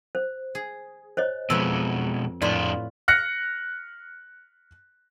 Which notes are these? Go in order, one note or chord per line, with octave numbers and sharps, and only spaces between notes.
C5
G#4
C5 C#5 D#5
F2 B2 G#3 B4 E6
F2 A2 D4 F4 B4 D5 C6
F6 F#6 A#6 C#7